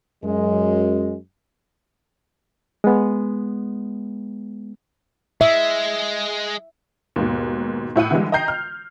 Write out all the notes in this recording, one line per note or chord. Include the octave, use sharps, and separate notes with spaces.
F#2 G#3
G#3 B3
G#3 E5
D#2 G#2 B2
A2 E4 F#5 D#7
D3 E3 G3 G#3
D#5 G5 A#5 G6 C7
F6